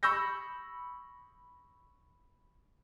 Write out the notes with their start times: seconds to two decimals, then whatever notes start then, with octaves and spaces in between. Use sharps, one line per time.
0.03 B5 C#6 E6 G6 A#6